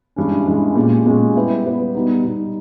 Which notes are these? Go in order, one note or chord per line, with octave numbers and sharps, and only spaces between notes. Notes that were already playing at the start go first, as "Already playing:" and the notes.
G2 E3 G#3 C#4
G2 E3 G#3 C#4
A#2 G#3 C#4 G4
A#2 G#3 C#4 G4
G3 B3 E4 G4 B4
G3 B3 E4 G4 B4
B2 G3 B3 D#4
B2 G3 B3 D#4